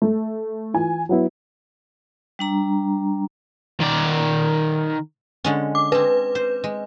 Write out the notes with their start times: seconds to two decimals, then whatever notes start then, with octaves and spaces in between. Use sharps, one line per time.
0.02 A3
0.74 E3 F4 G#5
1.09 F#3 B3 E4
2.39 G3 D4 A#5
3.80 D#3 D5
5.44 D3 G#3 C#4
5.75 D6
5.92 C4 G#4 B4
6.35 C5
6.64 G#3